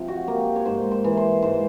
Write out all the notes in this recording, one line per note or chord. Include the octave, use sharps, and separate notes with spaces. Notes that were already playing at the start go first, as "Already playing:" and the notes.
Already playing: C3 F3
F#4
A#3 G4
C#5
G#2 C5
C5
E3
C5
G#2 C5